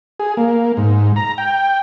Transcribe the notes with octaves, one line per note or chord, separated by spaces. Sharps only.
G#4
A#3
G#2
A#5
G5